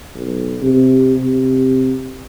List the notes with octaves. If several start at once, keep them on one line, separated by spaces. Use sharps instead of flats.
B1
C3
C3